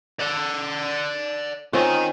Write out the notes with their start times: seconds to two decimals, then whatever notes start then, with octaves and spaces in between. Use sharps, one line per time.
0.20 D5 F#5
1.73 D#3 C4 C#4 F4 D#5